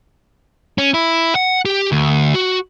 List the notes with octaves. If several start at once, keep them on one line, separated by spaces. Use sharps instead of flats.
C#4
E4
F#5
G4
D2
F#4